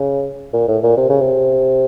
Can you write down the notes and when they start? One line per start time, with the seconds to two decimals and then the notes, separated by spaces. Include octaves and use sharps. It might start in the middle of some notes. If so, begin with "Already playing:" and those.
Already playing: C#3
0.53 A#2
0.68 A2
0.83 A#2
0.97 C3
1.10 C#3
1.21 C3